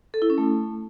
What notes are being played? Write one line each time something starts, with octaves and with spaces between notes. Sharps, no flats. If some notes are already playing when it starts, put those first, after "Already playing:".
A4
E4
C#4
A3